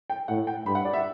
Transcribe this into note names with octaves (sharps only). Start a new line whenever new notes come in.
G5
A2 F#5
G5
G2 B5
F#5
D5
E5